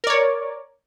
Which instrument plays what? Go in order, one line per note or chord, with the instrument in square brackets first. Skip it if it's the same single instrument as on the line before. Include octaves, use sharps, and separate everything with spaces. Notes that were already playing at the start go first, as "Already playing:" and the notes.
[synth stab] A#4
D5
C#5